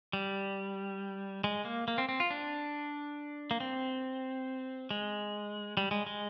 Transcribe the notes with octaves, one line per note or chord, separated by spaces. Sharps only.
G3
G#3
A#3
A#3
C4
C4
F4
D4
A#3
C4
G#3
G3
G#3
G#3